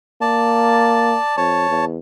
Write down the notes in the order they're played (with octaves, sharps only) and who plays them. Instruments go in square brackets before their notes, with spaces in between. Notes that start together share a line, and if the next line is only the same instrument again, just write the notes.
[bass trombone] A#3 [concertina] D5 A5
[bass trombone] F2 [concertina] C#5 A5
[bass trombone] E2